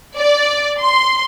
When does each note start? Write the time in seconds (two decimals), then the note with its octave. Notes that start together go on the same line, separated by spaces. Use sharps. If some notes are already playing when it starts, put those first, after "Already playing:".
0.17 D5
0.82 C6